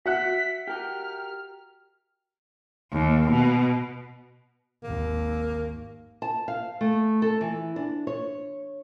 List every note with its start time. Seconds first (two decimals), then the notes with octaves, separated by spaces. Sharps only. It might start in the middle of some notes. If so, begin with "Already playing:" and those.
0.06 F#4 E5 F#5 F#6 B6
0.67 G4 A#4 G5 F6
2.92 D#2
3.31 B2
4.83 G#1 D#2 A#3
6.22 A5
6.48 F5
6.81 A3
7.22 A4
7.41 E3
7.76 D4
8.07 C#5